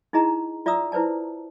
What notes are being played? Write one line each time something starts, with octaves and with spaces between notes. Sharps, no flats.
D#4 E4 G#4 D#5 A#5
F4 D5 E5 A#5 D#6 E6
E4 B4 C5 D5 A5